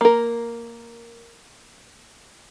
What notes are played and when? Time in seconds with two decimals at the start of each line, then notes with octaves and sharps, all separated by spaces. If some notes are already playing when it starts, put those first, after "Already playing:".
0.01 A#3 A#4